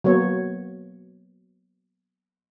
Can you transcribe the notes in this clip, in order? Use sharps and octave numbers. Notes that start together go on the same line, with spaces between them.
F#3 A#3 B3 C#5